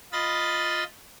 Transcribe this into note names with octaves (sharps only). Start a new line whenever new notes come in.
F4 D#5 B5 A6